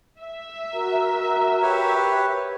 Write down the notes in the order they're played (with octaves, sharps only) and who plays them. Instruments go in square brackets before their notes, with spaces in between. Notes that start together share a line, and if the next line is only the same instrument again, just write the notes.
[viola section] E5
[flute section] F#4 A#4 A#5
[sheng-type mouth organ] G4 B4 C#5